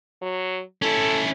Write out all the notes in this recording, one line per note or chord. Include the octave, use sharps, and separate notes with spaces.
F#3
C#4 E4 A4